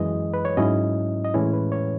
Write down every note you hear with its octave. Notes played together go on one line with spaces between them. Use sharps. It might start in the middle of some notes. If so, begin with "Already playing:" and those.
Already playing: F#2 E3 G#3 D#5
B4
C#5
G#2 F#3 C#4 E4 D#5
D#5
A2 E3 G#3 C#4 E4 C#5
B4
C#5